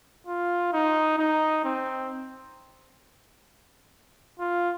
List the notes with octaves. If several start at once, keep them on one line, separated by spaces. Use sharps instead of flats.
F4
D#4
D#4
C4
F4